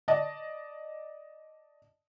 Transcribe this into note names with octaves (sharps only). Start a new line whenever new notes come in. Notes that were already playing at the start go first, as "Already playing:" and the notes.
D5 D#5 A5